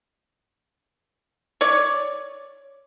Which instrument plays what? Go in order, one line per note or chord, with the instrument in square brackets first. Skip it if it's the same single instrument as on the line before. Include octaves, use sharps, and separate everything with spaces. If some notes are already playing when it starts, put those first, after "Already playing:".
[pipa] C#5 D5